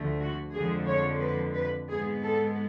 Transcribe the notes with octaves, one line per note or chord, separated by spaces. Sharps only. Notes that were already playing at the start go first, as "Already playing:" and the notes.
Already playing: D2 D3 F3 A3
F#4
F2 D3 F3 G#3 G#4
C#5
B4
B4
G#2 G#3 B3 G#4
A4